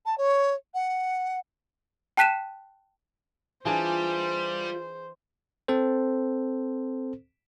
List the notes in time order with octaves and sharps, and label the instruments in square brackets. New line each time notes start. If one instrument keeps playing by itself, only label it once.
[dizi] A5
C#5
F#5
[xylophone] G5 A5 F#6 B6 D#7 E7
[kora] E3 D4 G#4 [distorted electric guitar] G3 [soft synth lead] F4 [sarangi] C5
[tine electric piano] C4 A4 C5